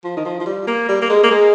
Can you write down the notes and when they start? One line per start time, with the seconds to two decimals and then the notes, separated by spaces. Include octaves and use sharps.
0.04 F3
0.17 D#3
0.25 F3
0.40 F3
0.46 G3
0.67 A#3
0.89 G3
1.02 A#3
1.10 G#3
1.23 A#3
1.31 G#3